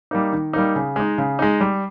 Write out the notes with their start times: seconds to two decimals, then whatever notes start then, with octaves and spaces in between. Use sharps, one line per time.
0.11 G3 A#3 D#4
0.33 D#3
0.53 G3 A#3 D#4
0.76 C#3
0.96 G#3 D#4
1.18 C#3
1.39 G#3 D#4
1.60 G3